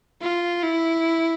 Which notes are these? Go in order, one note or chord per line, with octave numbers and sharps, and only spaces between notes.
F4
E4